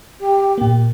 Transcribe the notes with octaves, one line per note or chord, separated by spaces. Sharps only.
G4
A#2 A#3